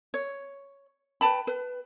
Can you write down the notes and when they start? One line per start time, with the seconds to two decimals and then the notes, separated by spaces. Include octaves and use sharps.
0.14 C#5
1.21 B4 G5 A5 B5
1.47 B4